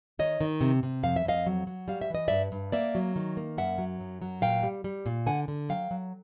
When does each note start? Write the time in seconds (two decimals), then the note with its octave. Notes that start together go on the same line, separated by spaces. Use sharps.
0.19 D#3 C#5 D#5
0.41 D#3
0.61 C3
0.83 C3
1.03 F2 F5
1.16 E5
1.25 F2 D#5 F5
1.46 F#3
1.67 F#3
1.88 G3 F5
2.01 E5
2.10 E3 D#5
2.28 G2 D5 E5
2.52 G2
2.72 A#3 D5 E5
2.95 F#3
3.16 D#3
3.37 A#3
3.58 F#2 E5 F#5
3.78 F#3
4.00 F#2
4.22 F#3
4.42 A#2 F5 G5
4.63 G3
4.84 G3
5.06 A#2
5.26 D3 F#5 G#5
5.48 D3
5.69 F#3 F5 G5
5.91 F#3